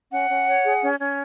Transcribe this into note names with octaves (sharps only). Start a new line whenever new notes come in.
C#4 F#5
C#4
C#5
G#4
C#4
C#4